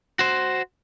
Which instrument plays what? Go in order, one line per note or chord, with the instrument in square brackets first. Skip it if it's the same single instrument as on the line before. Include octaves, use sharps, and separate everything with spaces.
[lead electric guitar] F#4 C5